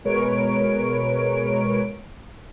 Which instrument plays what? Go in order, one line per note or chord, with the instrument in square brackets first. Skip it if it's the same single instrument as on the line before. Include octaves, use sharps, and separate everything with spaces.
[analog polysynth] B2 G#3 A#4 B4 C#5 D7